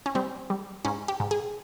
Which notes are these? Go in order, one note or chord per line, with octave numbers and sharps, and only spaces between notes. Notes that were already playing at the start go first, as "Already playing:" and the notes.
C#4
G3 C4
G3
G#2 C#4
G4
G#2
G#4